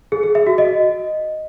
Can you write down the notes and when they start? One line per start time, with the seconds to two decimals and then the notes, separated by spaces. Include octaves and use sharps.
0.12 G#4
0.24 G#4
0.35 E5
0.47 F#4
0.58 D#5